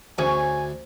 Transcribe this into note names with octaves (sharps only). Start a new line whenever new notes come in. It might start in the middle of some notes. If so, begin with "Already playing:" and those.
D2 C#4 G#4 C5 C#5 G#5